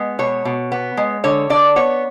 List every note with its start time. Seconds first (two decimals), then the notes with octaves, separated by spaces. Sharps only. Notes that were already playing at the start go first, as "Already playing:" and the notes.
Already playing: G#3 B3
0.19 B2 C#5
0.45 B2
0.72 B3
0.97 G#3
1.24 D3 C#5
1.50 D3 D5
1.76 B3 C#5